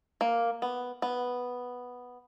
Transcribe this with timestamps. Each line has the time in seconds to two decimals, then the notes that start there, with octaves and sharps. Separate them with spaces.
0.21 A#3
0.62 B3
1.02 B3